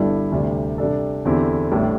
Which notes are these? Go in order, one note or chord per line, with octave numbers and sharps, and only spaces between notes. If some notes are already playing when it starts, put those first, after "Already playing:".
Already playing: G1 G2 G3 E4 A4
D2 C3 G3
C3 G3 D4 A4
E2 D3 C4 E4 G4
A1 A2 G3 D4